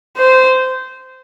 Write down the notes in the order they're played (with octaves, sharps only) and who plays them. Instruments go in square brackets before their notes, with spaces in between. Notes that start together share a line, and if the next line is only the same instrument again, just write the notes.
[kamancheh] C5